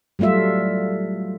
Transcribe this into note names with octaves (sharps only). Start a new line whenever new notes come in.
F#3 G3 A3 F4 E5